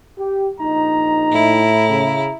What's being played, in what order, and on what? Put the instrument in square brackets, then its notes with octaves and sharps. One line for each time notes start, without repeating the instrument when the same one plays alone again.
[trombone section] G4
[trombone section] A#1 D#4 [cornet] A#5
[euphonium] A2 [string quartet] E4
[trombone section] C#3